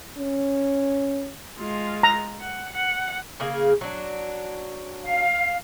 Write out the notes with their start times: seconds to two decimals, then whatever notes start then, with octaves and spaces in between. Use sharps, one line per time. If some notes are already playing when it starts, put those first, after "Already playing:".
0.18 C#4
1.59 G#3 F4
2.03 A#5
2.41 F#5
2.73 F#5
3.40 C#3 A#3 G#4
3.81 F#3 D4
5.03 F5